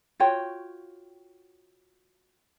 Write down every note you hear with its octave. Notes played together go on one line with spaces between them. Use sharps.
F4 F#4 C#5 G5